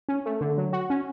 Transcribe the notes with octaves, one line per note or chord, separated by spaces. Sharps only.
C#4
A3
D3
F#3
F#4
C#4